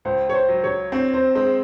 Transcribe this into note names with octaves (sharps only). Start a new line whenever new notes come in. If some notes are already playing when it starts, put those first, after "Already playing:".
C#2 C5
C#5
C5
F#3
C#5
C4 C#5
C5
G#3 C5